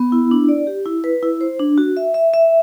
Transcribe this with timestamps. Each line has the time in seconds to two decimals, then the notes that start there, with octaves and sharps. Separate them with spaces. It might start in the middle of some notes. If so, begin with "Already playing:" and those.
Already playing: B3
0.12 E4
0.31 D4
0.49 D5
0.67 G4
0.86 E4
1.04 B4
1.23 E4
1.41 C5
1.59 D4
1.78 F#4
1.97 E5
2.14 E5
2.34 E5